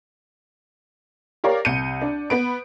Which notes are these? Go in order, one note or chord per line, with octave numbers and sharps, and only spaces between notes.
G4 A#4 C#5 D5 F5
C2 G6 C#7 D#7
D4
B3 B4 D7